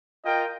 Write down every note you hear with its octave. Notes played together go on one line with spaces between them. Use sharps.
F4 A#4 D#5 G5